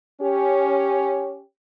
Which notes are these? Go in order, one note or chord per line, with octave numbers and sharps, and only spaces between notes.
C#4 G4